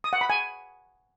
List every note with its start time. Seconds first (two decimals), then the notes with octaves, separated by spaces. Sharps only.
0.04 D#6
0.13 F#5
0.21 B5
0.30 G#5